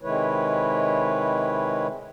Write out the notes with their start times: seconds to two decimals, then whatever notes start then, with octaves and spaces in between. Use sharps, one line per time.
0.02 C3 D#3 G#3 E4 B4 C#5